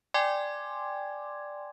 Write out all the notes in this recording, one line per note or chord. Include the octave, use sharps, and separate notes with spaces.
D5 G5 G#5 C6 D6 G#6